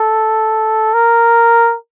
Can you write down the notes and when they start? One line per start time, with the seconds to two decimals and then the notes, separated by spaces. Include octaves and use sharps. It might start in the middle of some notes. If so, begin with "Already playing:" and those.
Already playing: A4
0.93 A#4